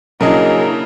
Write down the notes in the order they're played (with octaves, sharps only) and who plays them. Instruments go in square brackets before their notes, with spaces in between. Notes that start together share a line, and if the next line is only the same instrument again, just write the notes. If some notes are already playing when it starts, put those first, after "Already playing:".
[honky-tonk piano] C#3 D4 [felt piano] F#3 G#4 D#5 [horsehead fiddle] A#3 E4 [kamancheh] A#4